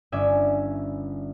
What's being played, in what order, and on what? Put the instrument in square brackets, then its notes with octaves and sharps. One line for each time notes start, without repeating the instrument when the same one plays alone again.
[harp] G1 C#4 D5 E5 G#6